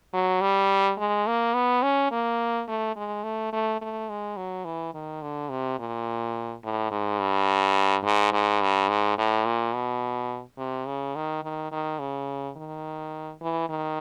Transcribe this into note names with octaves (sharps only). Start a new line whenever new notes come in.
F#3
G3
G#3
A#3
B3
C#4
A#3
A3
G#3
A3
A3
A3
G#3
F#3
E3
D#3
D3
C3
A#2
A2
G#2
G2
G#2
G#2
G2
G#2
A2
A#2
B2
C3
C#3
D#3
D#3
D#3
C#3
D#3
E3
D#3